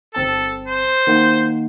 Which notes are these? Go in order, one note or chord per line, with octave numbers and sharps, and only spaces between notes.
G1 C4 A4 A5
C5
D#3 A#3 F#5